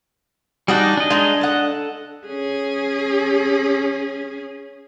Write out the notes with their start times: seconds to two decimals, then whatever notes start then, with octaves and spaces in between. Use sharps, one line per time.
0.68 G3 D4 D#4 F#4 G#4
0.97 D4 D#5
1.10 G#3 D#4 G#5
1.41 A4 F#5
2.27 C#4 G#4